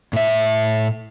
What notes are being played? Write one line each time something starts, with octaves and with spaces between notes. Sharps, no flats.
A2 E5